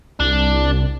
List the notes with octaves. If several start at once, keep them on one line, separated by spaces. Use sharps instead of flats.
C2 D4